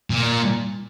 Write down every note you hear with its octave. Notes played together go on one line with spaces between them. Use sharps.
A#2